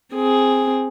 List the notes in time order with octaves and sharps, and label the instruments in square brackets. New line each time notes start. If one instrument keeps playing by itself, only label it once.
[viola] C4 G#4